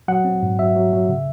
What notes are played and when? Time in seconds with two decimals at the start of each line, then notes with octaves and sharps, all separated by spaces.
0.08 F#3 F#5
0.25 C4
0.43 G#2
0.59 F#3 E5
0.76 F#3
0.93 F#3
1.09 C#3